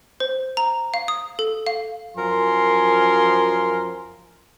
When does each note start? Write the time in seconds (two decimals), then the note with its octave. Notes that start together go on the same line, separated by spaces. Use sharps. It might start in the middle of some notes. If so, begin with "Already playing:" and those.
0.20 C5
0.57 A#5
0.94 F5
1.08 D#6
1.39 A4
1.66 F5
2.16 F#2 F3 A#4 G#5 C6